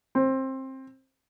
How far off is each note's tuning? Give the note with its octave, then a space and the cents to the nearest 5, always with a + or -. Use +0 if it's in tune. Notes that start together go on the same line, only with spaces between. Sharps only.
C4 +20